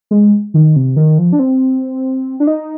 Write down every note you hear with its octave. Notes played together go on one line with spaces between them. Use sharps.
G#3
D#3
C3
D#3
F3
D4
C4
D4
D#4